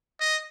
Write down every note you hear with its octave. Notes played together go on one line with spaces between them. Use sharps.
D#5